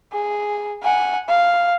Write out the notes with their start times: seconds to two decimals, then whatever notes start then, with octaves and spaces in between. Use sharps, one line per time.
0.13 G#4
0.83 F#5 G#5
1.28 F5